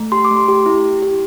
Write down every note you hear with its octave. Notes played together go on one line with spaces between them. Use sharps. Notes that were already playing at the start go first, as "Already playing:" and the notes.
Already playing: A3
G4 C6
D6
A3
C6
G4
E4
G4
G4